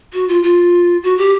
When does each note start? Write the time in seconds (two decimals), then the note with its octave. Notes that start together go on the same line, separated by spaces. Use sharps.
0.14 F#4
0.28 F4
0.43 F4
1.03 F#4
1.18 G4